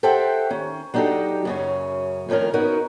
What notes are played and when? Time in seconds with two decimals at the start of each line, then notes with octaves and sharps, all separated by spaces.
0.03 G4 A4 C5 E5 F#5 G5
0.50 D#3 C#4
0.94 F#3 D4 D#4 G4 A4 D#5
1.45 F#2 C#3 C#4
2.29 F2 A2 D#3 C#4 A#4
2.54 B3 C#4 D#4 F#4 A#4 F#5